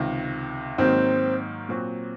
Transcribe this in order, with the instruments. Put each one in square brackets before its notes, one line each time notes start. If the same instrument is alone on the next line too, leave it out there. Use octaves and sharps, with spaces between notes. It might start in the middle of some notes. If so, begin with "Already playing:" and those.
Already playing: [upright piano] C#2 C3 D#3
[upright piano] G#2 D#3 F#3 A#3 D#4 [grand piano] C4
[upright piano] A#2 F#3 C4 F#4